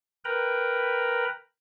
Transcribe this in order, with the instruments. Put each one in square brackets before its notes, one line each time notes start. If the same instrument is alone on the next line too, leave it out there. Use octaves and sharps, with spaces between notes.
[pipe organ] A#4 B4 G5 A#5 B5